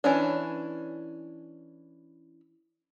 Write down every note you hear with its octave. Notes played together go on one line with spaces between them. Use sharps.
E3 C#4 D4